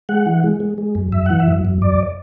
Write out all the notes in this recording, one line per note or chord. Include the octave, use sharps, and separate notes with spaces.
G#3 F#5
E3
G#3
G#3
G#3
F#2
F#2 E5
E3 F#5
E5
F#2
F#2
F#2 D5